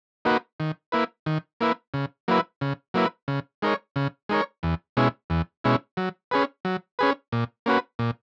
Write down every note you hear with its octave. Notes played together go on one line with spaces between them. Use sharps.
A#3 D#4 F#4 B4
D#3
A#3 E4 B4
D#3
A#3 E4 B4
C#3
F#3 A#3 E4 B4
C#3
F#3 A#3 E4 B4
C#3
G#3 D#4 A#4 C#5
C#3
G#3 D#4 A#4 C#5
E2
B2 G#3 C#4 E4
E2
B2 G#3 C#4 E4
F#3
C#4 G#4 B4
F#3
C#4 G#4 B4
A#2
A#3 C#4 F#4 B4
A#2